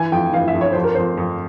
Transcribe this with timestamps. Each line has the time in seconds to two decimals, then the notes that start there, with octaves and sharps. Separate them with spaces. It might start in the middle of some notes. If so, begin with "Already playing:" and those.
Already playing: E3 G#5
0.12 F2 G5
0.33 E3 F5
0.48 E5
0.54 F2
0.61 C#5
0.72 F2 C5
0.84 A#4
0.95 F2 C5
1.17 F2